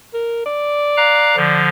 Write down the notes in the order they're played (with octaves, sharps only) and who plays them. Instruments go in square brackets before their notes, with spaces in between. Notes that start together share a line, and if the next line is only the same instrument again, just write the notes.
[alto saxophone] A#4
D5
[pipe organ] F5 A#5 F#6
D3 F3